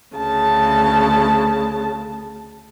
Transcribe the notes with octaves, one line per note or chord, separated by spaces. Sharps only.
D2 C#3 A5